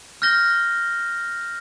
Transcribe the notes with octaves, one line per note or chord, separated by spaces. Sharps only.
F6 G6 A#6 G7